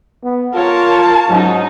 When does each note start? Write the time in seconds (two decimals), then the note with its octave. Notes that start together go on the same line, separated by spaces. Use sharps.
0.24 B3
0.55 F4 A#4 C#5 A5
1.29 G#2 F#3 C#4 D#4